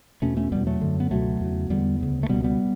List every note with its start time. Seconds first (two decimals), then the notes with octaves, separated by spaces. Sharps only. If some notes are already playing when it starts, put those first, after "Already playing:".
0.22 E2 B2 A3 C#4
0.37 A3 C#4
0.52 E2 B2 G3 B3
0.67 F#3 A3
0.81 F#2 D3
1.00 B3
1.10 C#2 B2 F#3 A3
1.40 E2 C#3
1.70 E2 D3 G3 B3
2.00 D2 C#3
2.23 A3
2.29 C#2 B2 G3 B3
2.44 G3 B3